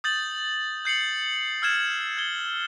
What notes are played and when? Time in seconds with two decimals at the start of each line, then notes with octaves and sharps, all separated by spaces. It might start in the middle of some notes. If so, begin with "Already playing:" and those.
0.04 D#6 G6 A6 F#7
0.85 G6 C7 C#7 F#7
1.62 E6 F6 G#6 E7
2.18 G#6 G7